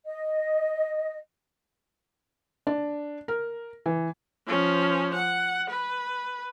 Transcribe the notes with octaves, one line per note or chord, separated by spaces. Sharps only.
D#5
D4
A#4
E3
F3 C#4
F#5
B4